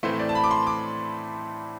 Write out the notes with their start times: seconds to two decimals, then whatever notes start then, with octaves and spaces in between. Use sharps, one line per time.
0.03 A2 E3 A3 C4 C5
0.19 D5
0.29 A5
0.35 B5
0.44 D6
0.51 C6
0.67 D6